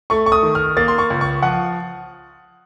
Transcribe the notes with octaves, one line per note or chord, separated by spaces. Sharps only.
A3 C#6
C#6
D#6
D#3
F6
A#3 A6
C6
C#6
C#2
C#6
F3 F#5